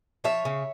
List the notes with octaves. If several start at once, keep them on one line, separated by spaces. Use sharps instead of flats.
F3 C#5 E5
C#3